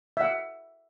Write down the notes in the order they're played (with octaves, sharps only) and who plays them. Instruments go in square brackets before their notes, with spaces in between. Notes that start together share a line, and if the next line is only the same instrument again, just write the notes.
[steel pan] E5 F#5